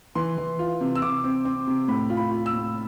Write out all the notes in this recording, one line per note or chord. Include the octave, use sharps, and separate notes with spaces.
E3 C6
E3
F4
C3
E6
C3 D6
C4
C4
C3
A2 B5
F4
B5
F4
E6
A2